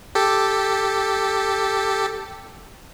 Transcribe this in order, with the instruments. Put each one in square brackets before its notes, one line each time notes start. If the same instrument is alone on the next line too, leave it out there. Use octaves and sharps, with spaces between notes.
[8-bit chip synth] G4 A4